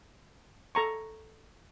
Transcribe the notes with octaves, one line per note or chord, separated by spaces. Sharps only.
A4 A#5 C#6